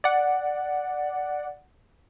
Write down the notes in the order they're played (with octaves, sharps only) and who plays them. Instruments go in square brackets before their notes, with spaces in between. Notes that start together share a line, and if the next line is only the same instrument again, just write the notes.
[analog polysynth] D5 F#5